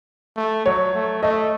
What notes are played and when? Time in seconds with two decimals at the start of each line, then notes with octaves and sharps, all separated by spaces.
0.36 A3
0.66 F#3 C#5
0.94 A3
1.23 A3 D#5